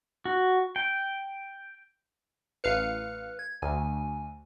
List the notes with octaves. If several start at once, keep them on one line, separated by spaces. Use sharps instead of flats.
F#4
G5
A1 B4 F5 C#7
G#6
D2 G#5